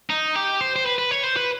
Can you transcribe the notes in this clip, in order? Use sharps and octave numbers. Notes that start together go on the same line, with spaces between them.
D#4
G4
C5
C5
B4
B4
C#5
C5
B4